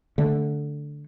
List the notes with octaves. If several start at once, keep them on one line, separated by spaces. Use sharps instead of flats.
D3 A3